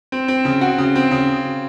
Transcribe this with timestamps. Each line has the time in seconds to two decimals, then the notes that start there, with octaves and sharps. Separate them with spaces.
0.12 C4
0.28 C4
0.45 C#3
0.61 F#4
0.78 C#3
0.96 C4
1.11 C#3